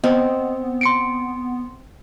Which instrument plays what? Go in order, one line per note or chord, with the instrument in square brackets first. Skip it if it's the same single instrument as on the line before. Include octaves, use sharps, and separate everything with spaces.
[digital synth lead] B3 [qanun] C4 [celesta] D#5
[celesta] C6 C#7 D7